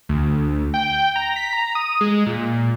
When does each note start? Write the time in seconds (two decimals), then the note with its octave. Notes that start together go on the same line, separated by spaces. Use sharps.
0.09 D2
0.74 G5
1.16 A#5
1.36 B6
1.53 A#5
1.75 D#6
2.01 G#3
2.27 A#2